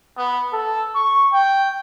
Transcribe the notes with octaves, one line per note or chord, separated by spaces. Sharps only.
B3
A4
C#6
G5